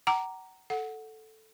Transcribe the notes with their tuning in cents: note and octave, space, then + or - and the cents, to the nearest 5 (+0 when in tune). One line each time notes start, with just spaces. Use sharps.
F#5 +30 A#5 +0 D6 +0
A4 +0 F#5 -5